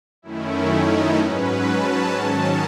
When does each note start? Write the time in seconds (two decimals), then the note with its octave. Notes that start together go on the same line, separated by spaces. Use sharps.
0.22 F#2 D#3 A3 C#4 E4
0.70 D#4
1.17 G#2 F#3 C#4 B4
1.65 A5
2.13 G#2 D#3 F#3 C#4 A5